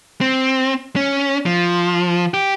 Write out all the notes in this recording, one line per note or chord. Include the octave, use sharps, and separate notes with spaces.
C4
C#4
F3
G4